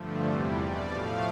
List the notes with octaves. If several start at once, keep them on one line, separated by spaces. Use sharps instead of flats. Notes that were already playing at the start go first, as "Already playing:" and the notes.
Already playing: G2 D3 F3 A3
E2 C3 E3 G3 C5
B2 G3 D5
A2 F3 A3 F5